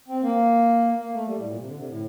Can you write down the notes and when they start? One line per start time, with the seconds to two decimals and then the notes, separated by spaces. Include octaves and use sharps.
0.08 C4
0.23 A#3
0.97 A#3
1.13 A3
1.27 G3
1.38 A2
1.47 A#2
1.57 C3
1.67 D3
1.77 C3
1.87 A2